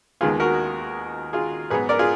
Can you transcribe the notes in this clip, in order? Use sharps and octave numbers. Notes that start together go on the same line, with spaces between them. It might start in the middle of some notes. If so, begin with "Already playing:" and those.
D#2 D#3 G#3 B3 F4 G#4
F#4 A#4
F4 G#4
G#2 F#3 B3 G#4 B4
A#4 D5
F4 G#4